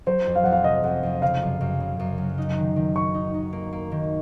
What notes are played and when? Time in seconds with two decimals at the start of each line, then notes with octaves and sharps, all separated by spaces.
0.06 F#3 C5
0.26 F2
0.35 F5
0.44 F2 F#5
0.52 F5
0.64 C3 D#5
0.83 F2 F#5
1.03 F2
1.22 C#3 F5
1.42 F#2
1.61 F#2
1.80 C#3
1.99 F#2
2.18 F#3
2.38 D#4
2.57 D#3
2.76 D#3
2.96 D#3 C#6
3.14 D#4
3.34 D#4
3.53 A#3
3.73 A#3
3.92 D#3